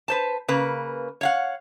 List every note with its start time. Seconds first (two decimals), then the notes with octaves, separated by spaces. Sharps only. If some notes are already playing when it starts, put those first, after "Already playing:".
0.08 B4 C5 A5
0.48 C#3 A#3 B4
1.21 C#5 F5 F#5